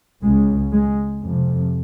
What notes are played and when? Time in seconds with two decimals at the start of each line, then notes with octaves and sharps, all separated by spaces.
0.23 C#2 C#3 G#3
0.73 G#3
1.24 F2 C3